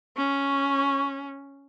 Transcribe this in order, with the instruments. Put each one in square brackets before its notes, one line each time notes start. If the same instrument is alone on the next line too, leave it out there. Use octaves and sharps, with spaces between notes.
[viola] C#4 [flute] C#6